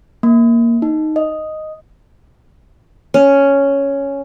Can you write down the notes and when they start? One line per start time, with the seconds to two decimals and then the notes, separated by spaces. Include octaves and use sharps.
0.23 A#3
0.82 D#4
1.16 D#5
3.14 C#4